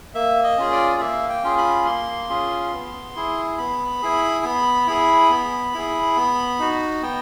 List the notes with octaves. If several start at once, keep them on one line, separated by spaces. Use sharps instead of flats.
A#3 E5
D#5
C#4 F4 G#4
D5
A#3 E5
G5
C#4 F4 G#4
B5
A#3 C6
C#4 F4 G#4
B3
E4 G#4
B3 B5
E4 G#4
B3
E4 G#4
B3
E4 G#4
B3
D#4 F#4
B3 G5